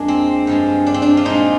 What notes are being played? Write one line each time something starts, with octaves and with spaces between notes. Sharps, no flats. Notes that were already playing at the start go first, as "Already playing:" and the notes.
Already playing: F2 F3 G#3 A#3 D4
C4
G2 F3 G#3
D4
C4
D4
F4
A#2 G#3 D#4